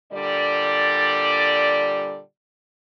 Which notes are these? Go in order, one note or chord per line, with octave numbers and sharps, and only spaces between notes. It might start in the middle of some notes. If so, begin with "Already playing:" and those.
A#2 D3 G3 D5